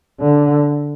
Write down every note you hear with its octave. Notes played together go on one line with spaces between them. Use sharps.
D3